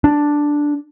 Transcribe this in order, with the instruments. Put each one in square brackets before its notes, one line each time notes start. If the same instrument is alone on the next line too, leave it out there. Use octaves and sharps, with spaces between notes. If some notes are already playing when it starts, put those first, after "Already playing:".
[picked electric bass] D4